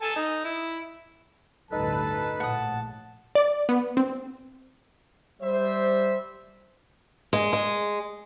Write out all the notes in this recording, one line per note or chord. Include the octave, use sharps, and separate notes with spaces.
A4 G#5 A5
D#4
E4
A1 D2 G2 D#4 A4 B4 A5
A#1 A2 F#5 A5 D#6
D5
B3
C4
G3 C5 E5
G#3
G#3